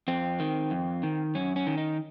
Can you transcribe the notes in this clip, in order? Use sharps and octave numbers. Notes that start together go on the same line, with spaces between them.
F2 C4
D#3
F2
D#3
F#2 C#4
C#4
D#3
D#4